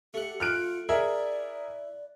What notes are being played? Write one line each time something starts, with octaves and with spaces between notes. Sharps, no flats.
A3 G4 F#5
F4 F6 F#6 D7
E4 G#4 A#4 D5 E5